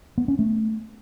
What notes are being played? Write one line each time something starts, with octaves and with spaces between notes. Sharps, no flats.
B3
C#4
A3